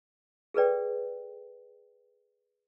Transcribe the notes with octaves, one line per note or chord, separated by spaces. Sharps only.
G#4 A4 B4 D5 G5